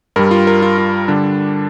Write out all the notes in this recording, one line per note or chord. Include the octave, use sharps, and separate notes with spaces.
G2 G3 A#4
F4
A#4
F4
F4
D3 G3 D4